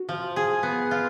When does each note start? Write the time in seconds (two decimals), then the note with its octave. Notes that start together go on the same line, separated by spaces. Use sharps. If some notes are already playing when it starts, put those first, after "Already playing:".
Already playing: F#4
0.09 F3
0.36 G#4
0.63 B3
0.91 F4